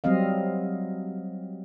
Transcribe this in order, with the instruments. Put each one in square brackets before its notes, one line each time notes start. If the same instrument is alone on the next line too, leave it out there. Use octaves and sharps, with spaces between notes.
[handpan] F#3 G3 C4 D#5 F5